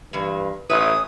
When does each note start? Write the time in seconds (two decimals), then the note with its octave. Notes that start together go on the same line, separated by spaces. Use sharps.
0.13 G2 E3 A#3
0.70 A1 B4 C#5 E5 D#6